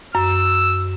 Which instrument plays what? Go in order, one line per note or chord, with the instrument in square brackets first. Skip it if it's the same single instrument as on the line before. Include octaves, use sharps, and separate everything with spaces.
[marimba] F#2 [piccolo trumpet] E6